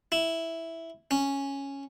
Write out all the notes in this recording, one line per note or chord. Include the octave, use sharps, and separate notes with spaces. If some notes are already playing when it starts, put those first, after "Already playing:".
E4
C#4